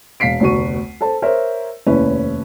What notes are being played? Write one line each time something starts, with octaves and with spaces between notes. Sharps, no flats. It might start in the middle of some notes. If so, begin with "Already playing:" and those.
E1 F5 B6 C7 D7
F1 D2 B3 F#4 C#6 D#7
A4 C5 A5
A#4 C5 C#5 E5
F1 D#2 C#4 E4 B4 C#5